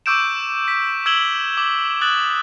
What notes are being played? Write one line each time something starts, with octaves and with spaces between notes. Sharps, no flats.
C#6 D6 E6 G6 D7 E7
B6
E6 G#6 D7 E7 F#7 G7
D6
D#6 F#6 A6 F#7